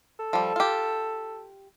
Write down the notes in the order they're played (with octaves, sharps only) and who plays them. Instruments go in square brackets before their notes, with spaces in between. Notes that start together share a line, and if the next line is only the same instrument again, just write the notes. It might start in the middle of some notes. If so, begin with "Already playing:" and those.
[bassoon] A4
[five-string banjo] F3 G3
F4 G4